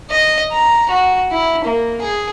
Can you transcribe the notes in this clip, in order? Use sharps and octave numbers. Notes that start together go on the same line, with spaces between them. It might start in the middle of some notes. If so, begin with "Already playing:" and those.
D#5
A#5
F#4
E4
A#3
G#4